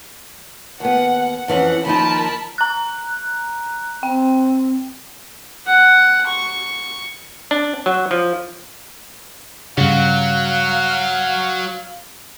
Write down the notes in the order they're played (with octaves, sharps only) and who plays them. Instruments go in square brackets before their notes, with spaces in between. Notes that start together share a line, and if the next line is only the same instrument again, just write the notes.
[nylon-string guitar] D#2 B3 [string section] F#5
[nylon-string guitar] F2 E3 C#4 [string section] F#5
[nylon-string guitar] D#2 F3 D#4 [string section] A#4 A5 B5
[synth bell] A#5 F#6
[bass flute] C4 [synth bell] G5
[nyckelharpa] F#5
C#6
[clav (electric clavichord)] D4
F#3
F3
[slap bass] G2 C#3 [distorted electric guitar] F#3 [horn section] F5